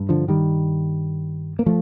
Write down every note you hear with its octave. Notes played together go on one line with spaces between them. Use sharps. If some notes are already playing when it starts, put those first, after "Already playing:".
Already playing: G2
D3 F3
D#3 G3
A#3
F3 A3